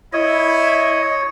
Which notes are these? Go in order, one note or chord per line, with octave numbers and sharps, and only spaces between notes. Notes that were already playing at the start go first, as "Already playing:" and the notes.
E4 C#5 D#5